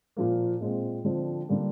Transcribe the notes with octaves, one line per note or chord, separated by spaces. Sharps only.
A#2 F3 A#3
A#2 G#3 C4
D3 F3 C4
D3 G3 A#3